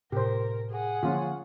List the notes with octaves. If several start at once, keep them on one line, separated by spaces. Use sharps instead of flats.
A2 C3 G4 A#4 C5
G#4 F#5
D3 F3 A#3 C#4 F4